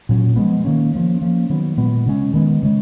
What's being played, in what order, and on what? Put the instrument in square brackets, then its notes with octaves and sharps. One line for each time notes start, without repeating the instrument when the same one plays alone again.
[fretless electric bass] A#2 F#3 C#4
F3 G#3 B3
D#3 A#3 C#4
F3 A#3 C#4
F3 A#3 C#4
D#3 F#3 B3
A#2 G#3 B3
C#3 G#3 C#4
D#3 G#3 B3
C#3 G#3